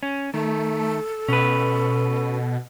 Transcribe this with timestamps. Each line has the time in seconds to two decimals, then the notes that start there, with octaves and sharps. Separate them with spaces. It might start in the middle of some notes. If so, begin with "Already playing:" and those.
0.03 C#4
0.34 D#3 A3 A4
1.28 B2 C#4 B4